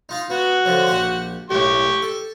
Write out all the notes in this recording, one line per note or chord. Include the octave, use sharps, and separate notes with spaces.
D#4 F4 F5
B3 F#4
D3 F3 F#3
A#1 G4 A5
B1 A2 G4 C#6
A4